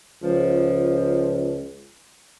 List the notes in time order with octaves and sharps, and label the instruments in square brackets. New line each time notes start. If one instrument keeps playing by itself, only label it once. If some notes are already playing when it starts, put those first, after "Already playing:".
[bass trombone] C#2 [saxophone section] F3